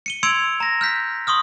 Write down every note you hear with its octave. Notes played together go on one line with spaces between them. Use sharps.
C#7 D#7 G7
C6 E6 G#6 C#7 D7 F7
A#5 A#6
F6 G6 B6
C6 C#6 D#6 F6